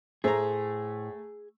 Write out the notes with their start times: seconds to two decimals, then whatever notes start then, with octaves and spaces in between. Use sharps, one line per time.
0.24 A2 A3 G#4 C5 A#5